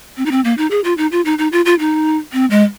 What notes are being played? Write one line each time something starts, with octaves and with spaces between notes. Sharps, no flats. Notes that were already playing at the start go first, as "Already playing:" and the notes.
C4
D#4
C4
A#3
D#4
G#4
F4
D#4
F4
D#4
D#4
F4
F4
D#4
C4
G#3